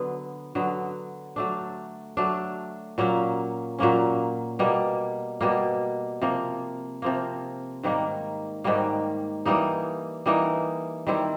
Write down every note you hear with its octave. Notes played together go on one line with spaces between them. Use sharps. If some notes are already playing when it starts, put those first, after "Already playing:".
Already playing: D3 F#3 B3
D3 F#3 B3
F#3 A3 D4
F#3 A3 D4
A#2 F#3 A#3 C#4
A#2 F#3 A#3 C#4
B2 G3 A#3
B2 G3 A#3
C3 F3 A#3
C3 F3 A#3
G#2 D#3 G3 A#3
G#2 D#3 G3 A#3
E3 G3 A#3 D#4
E3 G3 A#3 D#4
D#3 G3 C4 E4